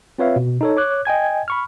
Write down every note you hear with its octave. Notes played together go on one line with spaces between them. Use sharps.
C4 F4 B4 C#5 E5 F5
B2
D#4 A4 C#5
C#5 D6 F#6
D#5 G5 G#5 G#6
B5 C#6 F6